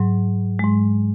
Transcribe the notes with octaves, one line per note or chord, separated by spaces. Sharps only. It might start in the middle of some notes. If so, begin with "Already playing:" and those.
Already playing: G#2 F#3
G#2 G#3